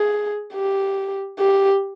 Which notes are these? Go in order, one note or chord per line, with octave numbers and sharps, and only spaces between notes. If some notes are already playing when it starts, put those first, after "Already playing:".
Already playing: G#4
G4
G4